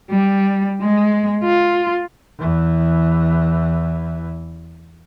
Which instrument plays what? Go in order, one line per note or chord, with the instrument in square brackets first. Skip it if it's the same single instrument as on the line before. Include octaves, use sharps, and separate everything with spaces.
[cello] G3
G#3
F4
[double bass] E2 E3